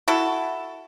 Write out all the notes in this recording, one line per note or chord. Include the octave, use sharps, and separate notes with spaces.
E4 F#4 A4